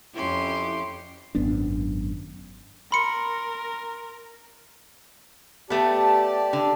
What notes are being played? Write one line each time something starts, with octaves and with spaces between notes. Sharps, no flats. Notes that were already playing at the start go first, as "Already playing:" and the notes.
F2 C#4 E4 G4 C6
G#1 F#2 B3 D4
A#4 B5 C6 C#7
A3 B3 G4 D5 A5
D3